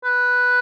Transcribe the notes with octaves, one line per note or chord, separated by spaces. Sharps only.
B4